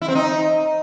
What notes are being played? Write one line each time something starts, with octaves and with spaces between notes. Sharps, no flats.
E4
C4
D#4